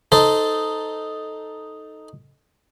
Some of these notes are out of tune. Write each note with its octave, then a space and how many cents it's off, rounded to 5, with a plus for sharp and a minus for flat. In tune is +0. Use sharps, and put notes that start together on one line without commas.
D#4 +0 A4 +0 C5 -20